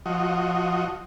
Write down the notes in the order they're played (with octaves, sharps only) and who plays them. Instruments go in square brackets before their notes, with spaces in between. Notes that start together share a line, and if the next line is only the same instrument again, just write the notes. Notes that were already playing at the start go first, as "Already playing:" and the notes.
[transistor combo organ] F3 F#4 D#5